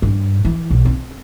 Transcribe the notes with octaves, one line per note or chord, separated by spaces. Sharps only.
G2
E3
B1
C4